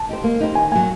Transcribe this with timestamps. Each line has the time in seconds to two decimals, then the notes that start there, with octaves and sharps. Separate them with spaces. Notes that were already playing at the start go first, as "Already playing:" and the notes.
Already playing: A5
0.09 D#4 G4 C5
0.24 A#3
0.40 D#4 G4 C5
0.55 D#3 G#5
0.71 F#3 A#3 G#5